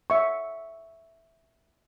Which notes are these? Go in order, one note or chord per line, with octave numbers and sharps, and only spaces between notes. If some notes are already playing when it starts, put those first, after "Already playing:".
E5 C#6